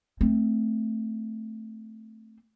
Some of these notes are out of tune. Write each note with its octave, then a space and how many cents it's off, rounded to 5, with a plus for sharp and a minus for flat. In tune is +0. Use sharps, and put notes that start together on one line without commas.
A3 +0 C4 +0